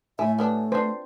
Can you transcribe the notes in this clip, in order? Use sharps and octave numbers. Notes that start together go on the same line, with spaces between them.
A2 E4 E5 G#5
G3 A3 B3 D4
D4 B4 C5